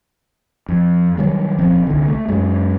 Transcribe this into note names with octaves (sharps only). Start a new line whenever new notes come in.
F2
D#3 F#3 G3
D#1 F3 C4
C2 D3
A3
F#2 G#3